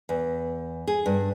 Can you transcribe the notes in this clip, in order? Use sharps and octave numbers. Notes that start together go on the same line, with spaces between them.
E2
G#4
G2